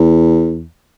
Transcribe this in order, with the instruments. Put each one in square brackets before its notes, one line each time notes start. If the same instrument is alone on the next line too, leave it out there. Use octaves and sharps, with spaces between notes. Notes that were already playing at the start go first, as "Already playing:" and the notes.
Already playing: [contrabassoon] E2